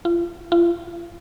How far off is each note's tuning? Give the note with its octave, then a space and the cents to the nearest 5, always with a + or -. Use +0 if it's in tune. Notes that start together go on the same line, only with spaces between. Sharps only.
F4 -35
F4 -35